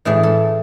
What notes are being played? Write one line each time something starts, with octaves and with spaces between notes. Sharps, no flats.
A2 E3 A3 G#4
A4